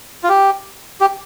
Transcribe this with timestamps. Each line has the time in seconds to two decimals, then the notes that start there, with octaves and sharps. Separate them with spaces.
0.24 F4
0.29 G4
1.01 G4